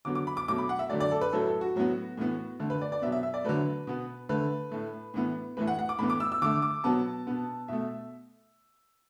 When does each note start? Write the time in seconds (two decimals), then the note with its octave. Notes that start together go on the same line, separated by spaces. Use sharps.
0.05 D3 F#3 B3 D6
0.15 D6
0.27 B5
0.37 D6
0.48 B2 F#3 A3 D6
0.58 B5
0.69 F#5
0.79 E5
0.90 D3 F#3 A3 D5
1.00 D5
1.11 A4
1.21 B4
1.33 A2 F#3 A3 A4
1.47 A4
1.61 F#4
1.76 A2 F#3 B3
2.17 A2 E3 B3
2.60 D3 A3
2.70 B4
2.81 D5
2.92 D5
3.02 B2 F#3 B3 E5
3.12 E5
3.23 E5
3.34 D5
3.45 D3 F#3 A3 B4
3.87 B2 B3
4.29 D3 A3 B4
4.71 A2 A3
5.14 A2 E3 B3
5.57 A2 E3 A3 B4
5.67 F#5
5.79 F#5
5.89 D6
5.99 A2 E3 B3 B5
6.10 D6
6.20 E6
6.32 E6
6.42 D3 A3 D6
6.62 D6
6.84 B2 F#3 B3 A5
7.27 B2 B3
7.68 B2 A3 E5